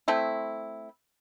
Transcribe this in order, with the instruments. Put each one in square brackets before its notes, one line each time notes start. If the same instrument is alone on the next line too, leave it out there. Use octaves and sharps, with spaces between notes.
[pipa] A3 C4 E4